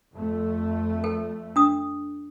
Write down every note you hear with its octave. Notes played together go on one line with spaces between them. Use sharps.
F2 A3
A4
D4 D#6